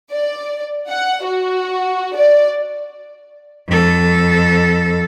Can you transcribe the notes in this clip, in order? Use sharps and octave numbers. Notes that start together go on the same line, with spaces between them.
D5
F#5
F#4
D5
F2 A4